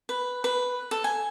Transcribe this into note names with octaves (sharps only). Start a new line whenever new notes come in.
B4
B4
A4
G#5